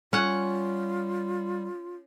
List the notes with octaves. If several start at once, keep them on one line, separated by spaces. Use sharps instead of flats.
G3 C#4 F4 F#5